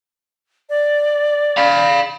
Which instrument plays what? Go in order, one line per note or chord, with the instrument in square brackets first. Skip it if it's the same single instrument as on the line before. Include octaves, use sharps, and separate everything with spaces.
[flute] D5
[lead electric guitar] F5 B5